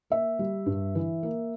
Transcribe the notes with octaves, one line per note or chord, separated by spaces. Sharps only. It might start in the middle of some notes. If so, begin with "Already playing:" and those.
A#3 E5
G3
G2
E3
A#3